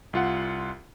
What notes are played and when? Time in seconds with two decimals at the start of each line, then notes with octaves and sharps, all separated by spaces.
0.13 C2 F4 F#5